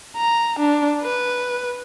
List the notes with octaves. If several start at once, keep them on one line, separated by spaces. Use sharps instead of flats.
A#5
D4
B4